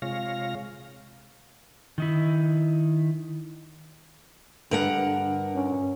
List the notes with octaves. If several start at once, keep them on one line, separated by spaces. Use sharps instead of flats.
C3 G#3 F4 C#5 F5 A#6
D#3 D#4 E4
G2 D3 A#4 F#5
C#4